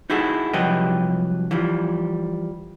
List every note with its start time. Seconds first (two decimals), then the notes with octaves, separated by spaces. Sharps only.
0.10 D#4 E4 F#4 G#4 A4
0.53 C2 F3 F#3 G4 B4 D#5
1.51 E3 F3 G3